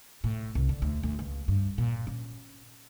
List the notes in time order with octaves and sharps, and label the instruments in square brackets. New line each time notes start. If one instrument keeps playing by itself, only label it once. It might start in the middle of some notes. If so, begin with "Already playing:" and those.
[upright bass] A2
C2
D3
D2
D2
C#2
G2
A#2
C#4